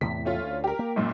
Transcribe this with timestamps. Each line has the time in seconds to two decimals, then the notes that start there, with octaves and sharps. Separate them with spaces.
0.01 E2 A2 C3 B6
0.25 A3 C#4 F4
0.40 D2
0.64 G4 A#4
0.79 A#3
0.96 B1 F#2 A#2